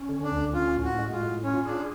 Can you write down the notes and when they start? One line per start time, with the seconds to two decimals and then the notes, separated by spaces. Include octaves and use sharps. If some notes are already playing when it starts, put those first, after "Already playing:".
Already playing: C#4
0.09 D3
0.24 D4
0.32 D2
0.53 C#4 F4
0.76 A2
0.84 F#4
0.99 G#3
1.13 F4
1.21 A2
1.44 C#4 F4
1.65 D4 G#4